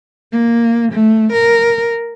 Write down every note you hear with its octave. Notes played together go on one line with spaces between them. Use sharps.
A#3
A3
A#4